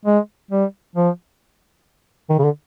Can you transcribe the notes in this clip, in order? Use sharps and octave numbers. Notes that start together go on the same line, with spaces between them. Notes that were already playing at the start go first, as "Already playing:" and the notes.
G#3
G3
F3
D#3
C#3
D3